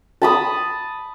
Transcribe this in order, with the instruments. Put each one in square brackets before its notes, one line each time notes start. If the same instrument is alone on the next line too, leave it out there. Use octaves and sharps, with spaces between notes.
[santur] A5 B5 D#6